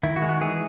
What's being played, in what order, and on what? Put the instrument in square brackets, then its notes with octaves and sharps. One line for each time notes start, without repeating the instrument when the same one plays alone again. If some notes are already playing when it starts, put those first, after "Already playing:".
[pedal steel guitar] D#3 E4
F#4
G#3
F#4
E3 G#4